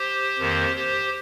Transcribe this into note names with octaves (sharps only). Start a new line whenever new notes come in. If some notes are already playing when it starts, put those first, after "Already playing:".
Already playing: G4 C5
F2 D#3 A#3
G4 C5